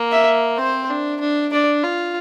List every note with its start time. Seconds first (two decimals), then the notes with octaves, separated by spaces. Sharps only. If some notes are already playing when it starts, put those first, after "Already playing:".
Already playing: A#3
0.12 E5
0.58 C4 C5
0.90 D4
1.20 D4
1.52 D4 D5
1.83 F4